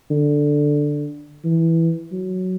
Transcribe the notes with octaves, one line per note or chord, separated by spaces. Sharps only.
D3
E3
F#3